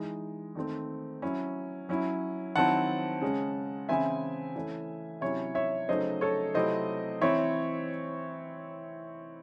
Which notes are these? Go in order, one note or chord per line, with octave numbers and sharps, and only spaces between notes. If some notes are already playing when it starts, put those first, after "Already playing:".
Already playing: E3 G#3 D#4
D#3 A3 C4
F#3 C#4 E4
F#3 C#4 E4
D#3 F#3 C4 E4 F#5 A5
C#3 G#3 C#4
C#3 E3 C4 E4 E5 G#5
E3 A3 C#4
C3 F#3 C#4 E4 C#5 E5
C#5 E5
C#3 F#3 A3 D#4 C5 D#5
A4 C#5
C3 F#3 A3 C4 E4 C5 D#5
E3 C4 E4 C#5 E5